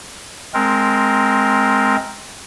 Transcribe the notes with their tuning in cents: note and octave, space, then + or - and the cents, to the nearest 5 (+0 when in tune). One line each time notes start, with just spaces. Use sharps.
G#3 +25 C4 +0 A#4 +0